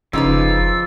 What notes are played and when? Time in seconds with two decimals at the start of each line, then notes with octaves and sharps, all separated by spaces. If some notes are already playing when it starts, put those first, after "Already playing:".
0.13 F1 C#3 F3 D#4 F4 B4 D5 E6